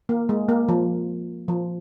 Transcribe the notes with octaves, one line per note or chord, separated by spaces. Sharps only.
A#3
G#3
A#3
F3
F3